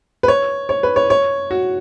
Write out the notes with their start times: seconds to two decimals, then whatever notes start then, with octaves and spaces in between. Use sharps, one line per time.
0.23 B4
0.28 C#5
0.69 C#5
0.83 B4
0.96 C#5
1.10 C#5
1.51 F#4